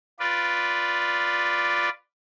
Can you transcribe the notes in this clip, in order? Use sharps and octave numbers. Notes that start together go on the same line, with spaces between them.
F4 B4 D5